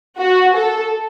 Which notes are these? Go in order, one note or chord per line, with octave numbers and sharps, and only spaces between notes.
F#4
A4